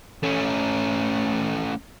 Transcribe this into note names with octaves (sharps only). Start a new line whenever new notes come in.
A3 C#4